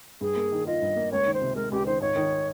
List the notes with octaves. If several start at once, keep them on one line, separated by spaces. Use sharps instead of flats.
G2 G#4
A#3
D#3
F4 D#5
G2
A#3
C#2 C#5
D#3
C5
C3
G#3 A#4
C#2 G4
D#3 C5
G#1 C#5
D#3